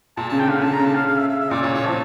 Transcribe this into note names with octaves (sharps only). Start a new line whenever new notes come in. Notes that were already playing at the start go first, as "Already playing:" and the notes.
A#2 A5
C#3 A5
C#3 G5
D3 F5
C#3 A5
D3 A#5
C#3 A5
F5
F5
E5
E5
E5
A#2 D5
A#2 C#5
A2 C#5
F3 A5